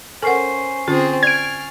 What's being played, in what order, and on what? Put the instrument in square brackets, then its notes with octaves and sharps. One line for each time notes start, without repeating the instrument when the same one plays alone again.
[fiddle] C#4 C5 [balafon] A4 A#4 F#5 [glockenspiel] G#5 C#6 C7
[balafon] D3 C#4 F4 [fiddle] C4 G#4 [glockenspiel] A6
[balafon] D5 [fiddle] F6 [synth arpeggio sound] G#6 D7